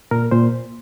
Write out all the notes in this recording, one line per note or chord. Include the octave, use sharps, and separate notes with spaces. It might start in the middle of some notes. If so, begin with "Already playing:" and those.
A#2 A#4
A#2 C5